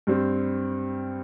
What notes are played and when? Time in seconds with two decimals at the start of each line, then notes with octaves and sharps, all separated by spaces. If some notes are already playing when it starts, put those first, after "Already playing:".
0.07 G2 G3 C4